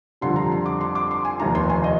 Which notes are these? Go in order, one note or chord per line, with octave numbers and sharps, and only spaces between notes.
F2 D3 G3 C6
A#5
C6
D6
C6
D6
C6
G#5
F1 D#2 D#3 A#5
C6
G#5
D#5